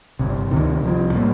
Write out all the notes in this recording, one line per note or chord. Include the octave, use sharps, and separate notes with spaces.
G1 F2 C3
D2 C3 D#3
C2 C3 F3
A2 G3 A#3